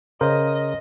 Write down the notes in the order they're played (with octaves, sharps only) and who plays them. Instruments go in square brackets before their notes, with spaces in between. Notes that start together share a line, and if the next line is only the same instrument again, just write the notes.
[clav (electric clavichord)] C#3 A#4 C5 [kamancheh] D#5